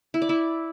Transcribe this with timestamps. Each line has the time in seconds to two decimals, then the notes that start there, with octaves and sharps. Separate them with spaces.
0.14 E4
0.22 D5
0.29 E4